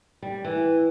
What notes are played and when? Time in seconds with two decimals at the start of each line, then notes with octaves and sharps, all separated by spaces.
0.22 G3
0.44 E3